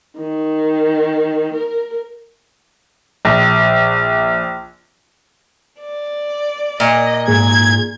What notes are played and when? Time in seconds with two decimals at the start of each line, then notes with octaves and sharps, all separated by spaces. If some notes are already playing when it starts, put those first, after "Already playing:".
0.18 D#3
1.54 A#4
3.25 A#1
5.81 D5
6.80 A#2 D#5
7.28 G#2 A#3 G#4 G#6